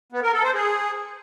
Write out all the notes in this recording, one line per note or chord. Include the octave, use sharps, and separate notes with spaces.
B3
A#4
A4
C5
G#4